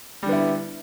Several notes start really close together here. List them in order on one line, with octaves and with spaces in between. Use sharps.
G3 D3 B3 E4